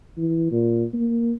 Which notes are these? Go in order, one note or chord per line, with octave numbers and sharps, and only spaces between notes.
E3
A#2
A#3